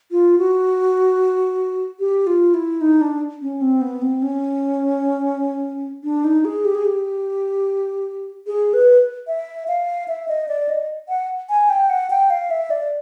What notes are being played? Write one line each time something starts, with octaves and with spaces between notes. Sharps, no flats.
F4
F#4
G4
F4
E4
D#4
D4
C#4
C4
B3
C4
C#4
D4
D#4
G#4
G4
G#4
G4
G#4
B4
E5
F5
E5
D#5
D5
D#5
F#5
G#5
G5
F#5
G5
F5
E5
D5